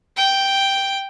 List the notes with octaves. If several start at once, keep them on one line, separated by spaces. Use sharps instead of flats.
G5